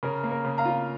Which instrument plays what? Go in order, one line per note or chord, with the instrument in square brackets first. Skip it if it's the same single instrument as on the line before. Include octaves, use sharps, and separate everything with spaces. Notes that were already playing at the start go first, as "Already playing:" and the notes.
[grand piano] C#3 [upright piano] A#4
[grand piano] A#3
[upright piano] A#4
[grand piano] C#3
[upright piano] F5 A#5
[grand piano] F4